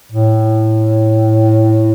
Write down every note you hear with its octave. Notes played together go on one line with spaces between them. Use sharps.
A2